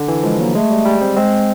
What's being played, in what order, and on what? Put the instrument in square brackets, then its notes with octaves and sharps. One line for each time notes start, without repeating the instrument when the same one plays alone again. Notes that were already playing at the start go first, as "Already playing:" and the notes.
Already playing: [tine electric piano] D3
E3
[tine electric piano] F3 [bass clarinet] G#3
[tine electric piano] F#3 [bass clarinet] A#3
[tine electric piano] G#3 [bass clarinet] A3
[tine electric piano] G3
G3
C4
[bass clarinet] G#3 [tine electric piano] C4